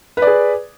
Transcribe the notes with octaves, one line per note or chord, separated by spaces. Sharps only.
G#4 B4 D5